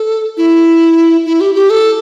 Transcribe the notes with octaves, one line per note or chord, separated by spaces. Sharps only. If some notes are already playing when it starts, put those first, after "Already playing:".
Already playing: A4
E4
E4
G4
G4
A4